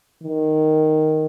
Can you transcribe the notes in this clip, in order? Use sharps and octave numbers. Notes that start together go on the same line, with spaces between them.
D#3